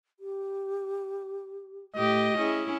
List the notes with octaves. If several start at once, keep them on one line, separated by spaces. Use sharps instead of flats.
G4
A2 G4 D#5
C#4 E4 G#4